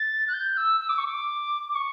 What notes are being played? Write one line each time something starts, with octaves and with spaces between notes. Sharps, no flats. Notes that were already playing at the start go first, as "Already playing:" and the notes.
Already playing: A6
F#6
G6
E6
E6
D6
C#6
D6
D6
C#6